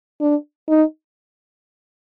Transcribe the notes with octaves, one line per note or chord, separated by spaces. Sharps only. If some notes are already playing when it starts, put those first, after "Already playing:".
D4
D#4